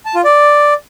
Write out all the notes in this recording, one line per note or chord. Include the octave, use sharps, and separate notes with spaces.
A5
F4
D5